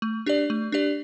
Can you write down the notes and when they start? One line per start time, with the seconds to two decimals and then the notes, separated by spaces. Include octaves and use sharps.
0.02 A3
0.26 D4 G4 D5
0.50 A3
0.72 D4 G4 D5